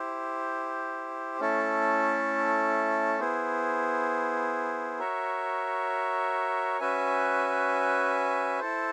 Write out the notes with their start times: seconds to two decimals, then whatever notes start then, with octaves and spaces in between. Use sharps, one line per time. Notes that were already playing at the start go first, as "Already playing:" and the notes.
Already playing: E4 G4 C5
1.40 A3 C#4 E4 A4
3.20 B3 E4 G#4 C5
4.99 F#4 A#4 C#5 E5
6.80 C#4 F#4 B4 E5 G#5
8.59 E4 A4 C5